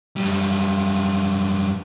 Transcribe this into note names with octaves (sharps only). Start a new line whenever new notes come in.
F#2 G3